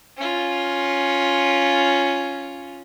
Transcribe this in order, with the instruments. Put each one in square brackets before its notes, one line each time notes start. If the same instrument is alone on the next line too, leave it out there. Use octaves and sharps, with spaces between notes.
[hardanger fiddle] C#4 F4